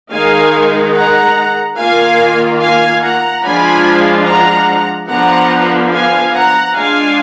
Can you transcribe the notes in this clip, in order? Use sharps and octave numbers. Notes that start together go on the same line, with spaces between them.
D#3 G#3 D#4 F5 G#5
F#5 A#5
D#3 A#3 F4 F5 G#5
F5 G#5
F#5 A#5
F3 G#3 D4 F4 G#5 B5
F#5 A#5
D3 F3 B3 F#5 A#5
F5 G#5
F#5 A#5
G#3 D4 F4 F5 G#5